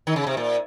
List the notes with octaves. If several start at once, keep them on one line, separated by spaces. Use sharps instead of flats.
D#3
C#3
C3
A#2